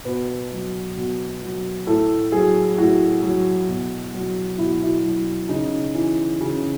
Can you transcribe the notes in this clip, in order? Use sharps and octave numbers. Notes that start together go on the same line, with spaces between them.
B2 B4
F#3
B2
F#3
A2 A4
F#3 G#4
A2 F#4
F#3
B2
F#3
B2 E4
F#4
E4
F#3
C#3 D#4
E3
C#3